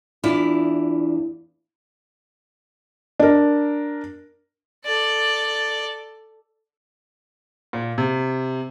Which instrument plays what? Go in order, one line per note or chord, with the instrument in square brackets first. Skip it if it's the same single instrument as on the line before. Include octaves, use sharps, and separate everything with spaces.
[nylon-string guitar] E2 D4 E4 F4
[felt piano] D4 A#4
[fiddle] A4 D5
[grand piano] A#2
C3